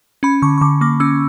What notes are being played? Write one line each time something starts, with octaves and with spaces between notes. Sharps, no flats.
C#4 B5
D3 C#6
C#6
D3 D6
A#3 D6
C#4 E6